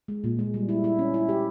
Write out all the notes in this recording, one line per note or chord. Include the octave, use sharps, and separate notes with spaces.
G#3
A#2
G#3
G3
E4
E4
C#4
E4
G4